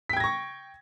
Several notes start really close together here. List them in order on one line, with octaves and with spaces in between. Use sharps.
B6 G5 G#6 A#6 C#6